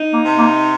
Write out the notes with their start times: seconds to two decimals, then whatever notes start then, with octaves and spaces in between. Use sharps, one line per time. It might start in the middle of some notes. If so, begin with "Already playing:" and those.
Already playing: D#4
0.13 A#3
0.25 C3
0.38 A#3